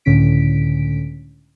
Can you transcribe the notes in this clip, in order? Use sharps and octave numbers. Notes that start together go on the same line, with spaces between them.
C#2 A2 D3 C#4 B6 D7